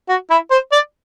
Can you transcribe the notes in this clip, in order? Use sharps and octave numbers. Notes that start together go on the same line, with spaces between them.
F#4
E4
C5
D5